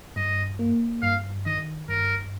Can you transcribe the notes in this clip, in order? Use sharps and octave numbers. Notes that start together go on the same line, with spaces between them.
G2 D#5
A#3
G2 F5
D#3 D#5
G2 A#4